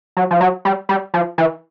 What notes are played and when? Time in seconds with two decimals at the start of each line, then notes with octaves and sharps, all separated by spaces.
0.17 F#3
0.31 F3
0.41 F#3
0.65 G3
0.89 G3
1.14 F3
1.38 E3